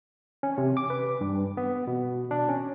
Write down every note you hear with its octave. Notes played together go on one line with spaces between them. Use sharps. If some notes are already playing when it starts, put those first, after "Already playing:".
C#4
C3
D6
B4
G2
B3
B2
D4
C#4